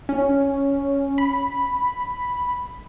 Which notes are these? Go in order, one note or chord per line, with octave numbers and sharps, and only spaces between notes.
C#4
B5